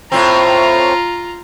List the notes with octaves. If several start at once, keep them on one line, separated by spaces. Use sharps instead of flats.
A2 C4 F4 A#5